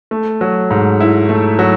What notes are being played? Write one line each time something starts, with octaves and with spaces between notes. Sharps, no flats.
A3
F#3
G#2
E4
A3
F#3